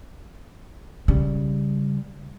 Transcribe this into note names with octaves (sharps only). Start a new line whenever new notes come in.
C#3 G3